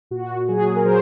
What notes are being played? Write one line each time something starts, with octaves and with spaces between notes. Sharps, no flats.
A#2 F#4
F#3 G#4
A#4
F#3 C5